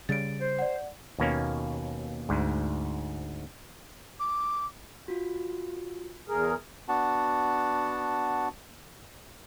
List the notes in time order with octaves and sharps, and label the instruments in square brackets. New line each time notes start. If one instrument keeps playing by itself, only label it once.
[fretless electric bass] C#3 G3 [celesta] A6 D7
[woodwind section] C5
[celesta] D5 F#5
[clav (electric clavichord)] D#2 B2 A#3 C#4
D2 G#2
[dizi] D6
[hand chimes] F4 F#4
[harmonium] E2 G#4 A#4
[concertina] B3 D4 F#4 F#5 A5